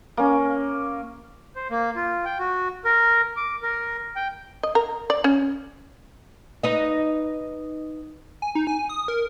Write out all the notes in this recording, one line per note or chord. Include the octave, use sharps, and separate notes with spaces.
A#3 C#4
C5
A#3
F4
G5
F#4
A#4
D6
A#4
G5
D#5
A#4
D5
C#4
D#4 B4 D#5
G#5
D#4
G#5
D#6
A#4